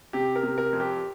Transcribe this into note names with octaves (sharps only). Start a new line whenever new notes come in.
C3 G4
A#4
C3
A#4
F2
G4